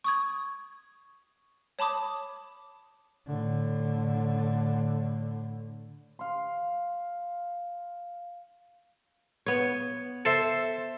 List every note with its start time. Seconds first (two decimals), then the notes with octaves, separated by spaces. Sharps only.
0.04 C#6 D#6 G#6
1.79 C#5 A5 B5 D6 D#6
3.27 A2 D3
6.19 F5 C6
9.46 B3 C#5
10.25 A4 C5 E5